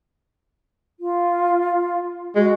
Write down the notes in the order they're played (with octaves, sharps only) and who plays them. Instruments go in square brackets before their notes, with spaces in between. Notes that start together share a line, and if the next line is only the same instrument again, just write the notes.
[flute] F4
[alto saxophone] G#3 [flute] F#4